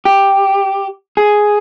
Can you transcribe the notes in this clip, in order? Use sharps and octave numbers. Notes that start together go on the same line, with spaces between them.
G4
G#4